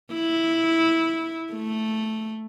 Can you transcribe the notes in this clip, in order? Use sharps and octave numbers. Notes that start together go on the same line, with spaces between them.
E4
A3